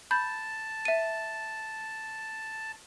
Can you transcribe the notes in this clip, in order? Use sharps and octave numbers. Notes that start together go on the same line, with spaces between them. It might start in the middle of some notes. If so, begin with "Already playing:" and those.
A5 B5 G6
E5 D#7